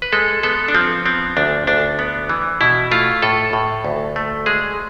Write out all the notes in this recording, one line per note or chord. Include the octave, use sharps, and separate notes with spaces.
B4
G#3 A4
B3 A4
D4
F3 C4
B3 C4
D2 D4
D2 D4
B3
E3
B2 E4
A3 F4
A2 A4
A2
D2
A3
G#3 G#4